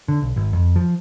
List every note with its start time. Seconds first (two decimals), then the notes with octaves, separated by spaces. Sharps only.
0.08 D3
0.22 B1
0.36 G#1
0.53 F2
0.76 F3